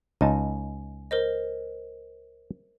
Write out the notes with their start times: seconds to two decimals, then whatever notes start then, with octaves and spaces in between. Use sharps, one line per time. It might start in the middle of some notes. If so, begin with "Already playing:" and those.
0.21 C#2 D#4 G#5 A5
1.11 A#4 C5 D#5